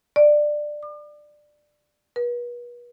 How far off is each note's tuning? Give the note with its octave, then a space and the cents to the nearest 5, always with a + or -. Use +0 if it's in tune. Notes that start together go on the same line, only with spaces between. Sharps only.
D5 +15
D6 +40
B4 -40